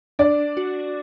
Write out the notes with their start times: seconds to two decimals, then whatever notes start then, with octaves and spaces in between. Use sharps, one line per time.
0.19 D4 D5
0.57 F#4